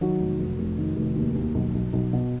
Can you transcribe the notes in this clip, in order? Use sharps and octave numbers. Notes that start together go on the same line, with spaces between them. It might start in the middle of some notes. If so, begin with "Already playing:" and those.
D#3 F#3 F#4
F1
F1
F1
D#3
F1
D#2
D#2
B1
B1
B1
B2